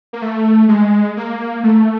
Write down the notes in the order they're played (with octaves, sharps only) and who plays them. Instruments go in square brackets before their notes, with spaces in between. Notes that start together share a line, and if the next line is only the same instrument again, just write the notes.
[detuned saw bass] A#3
A3
G#3
A#3
A3